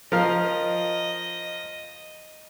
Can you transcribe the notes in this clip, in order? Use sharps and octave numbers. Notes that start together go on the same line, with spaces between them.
F3 A#4 D#5 F5